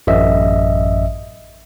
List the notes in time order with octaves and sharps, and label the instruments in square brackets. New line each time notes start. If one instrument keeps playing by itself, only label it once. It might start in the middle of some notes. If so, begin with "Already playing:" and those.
[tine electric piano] A1 F#2 D#5 E5